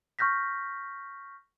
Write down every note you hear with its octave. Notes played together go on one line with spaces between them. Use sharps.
C#6 F6 G6 A#6 B6